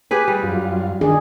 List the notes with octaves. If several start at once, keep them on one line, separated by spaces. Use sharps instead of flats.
G4 G#4 B4
G3
F#2 F4
D#3 D4 G#4